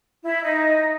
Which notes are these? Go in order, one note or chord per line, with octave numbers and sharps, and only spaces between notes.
E4
D#4